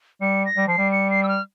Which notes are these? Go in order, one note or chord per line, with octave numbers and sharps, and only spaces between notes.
G3 C#7
A#6
G3
F3 C7
G3
C#7
C7
E6
F6